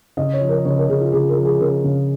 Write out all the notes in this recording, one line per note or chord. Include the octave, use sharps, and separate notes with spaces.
C#3 D#5
C#5
F3
A#4
C#3 C#5
A#4
C#3 G#4
F4
C#3 G#4
A#4
F3
G#4
C#3 A#4
C#3